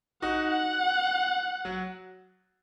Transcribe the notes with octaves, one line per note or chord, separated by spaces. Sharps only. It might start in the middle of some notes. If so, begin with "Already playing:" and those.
D#4 F#4 F#5
F#5
F#3